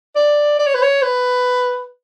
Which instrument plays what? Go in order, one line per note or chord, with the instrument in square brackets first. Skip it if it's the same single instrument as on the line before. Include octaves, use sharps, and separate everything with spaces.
[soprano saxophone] D5
D5
C#5
B4
C#5
B4